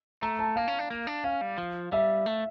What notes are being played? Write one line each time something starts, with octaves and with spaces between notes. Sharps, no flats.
A3 A#5
A5
A#3 F5
C#4
D4
A#3
D4
C#4 F5
G3
F3
G3 E5
A3